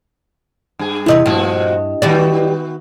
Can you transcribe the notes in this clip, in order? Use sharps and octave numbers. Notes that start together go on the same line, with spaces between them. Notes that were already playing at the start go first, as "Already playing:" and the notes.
G2 G#4
E2 C3 E4 B4 D#5
G2 A#2 F3 F#4
D#3 G3 B3 F#4 D5